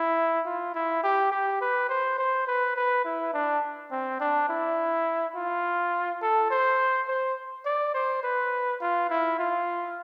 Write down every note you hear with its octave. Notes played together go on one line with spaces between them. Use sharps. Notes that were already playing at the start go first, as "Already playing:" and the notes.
Already playing: E4
F4
E4
G4
G4
B4
C5
C5
B4
B4
E4
D4
C4
D4
E4
F4
A4
C5
C5
D5
C5
B4
F4
E4
F4